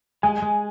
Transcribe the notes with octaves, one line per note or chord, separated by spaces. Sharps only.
G#3 G#5
G#3